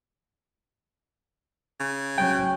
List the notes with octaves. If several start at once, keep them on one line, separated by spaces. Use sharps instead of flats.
C#3
F#3 C#4 G5